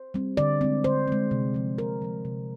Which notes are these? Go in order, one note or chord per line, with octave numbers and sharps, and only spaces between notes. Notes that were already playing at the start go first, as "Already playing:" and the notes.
Already playing: C5
G3 C4
D3 D5
G#3 C4
D3 C5
G#3 C4
C3
F3 G#3
C3 A#4
F3 G#3
C3